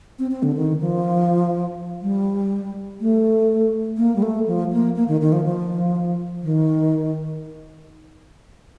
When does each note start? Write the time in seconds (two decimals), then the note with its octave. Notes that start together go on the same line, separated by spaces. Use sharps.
0.19 C4
0.31 C4
0.43 D3
0.56 D#3
0.81 F3
2.02 G3
3.00 A3
3.98 A#3
4.16 G3
4.22 A3
4.47 F3
4.72 A#3
4.96 A#3
5.08 D#3
5.21 D#3
5.32 F3
5.45 F3
6.43 D#3